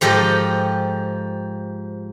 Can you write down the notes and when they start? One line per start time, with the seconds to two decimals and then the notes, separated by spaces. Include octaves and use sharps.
0.01 G#2 F3 G4 A4 D#5